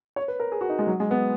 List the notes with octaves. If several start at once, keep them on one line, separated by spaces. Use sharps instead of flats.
C#5
B4
A#4
G#4
F#4
D#4
G#3
F#3
G#3
B3